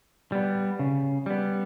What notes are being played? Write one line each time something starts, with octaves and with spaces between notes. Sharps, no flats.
G3 B3
C#3
G3 B3